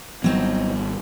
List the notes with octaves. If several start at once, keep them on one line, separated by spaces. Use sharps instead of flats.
G#1 F#3 G3 B3 C4 D#4